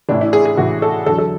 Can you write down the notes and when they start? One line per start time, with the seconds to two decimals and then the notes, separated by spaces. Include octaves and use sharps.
0.09 A1 A2 E3 D4
0.21 E4
0.33 G#4
0.45 G#4
0.57 A1 A2 E3 F#4
0.82 A4
1.06 E2 D3 F#3 A4
1.18 A4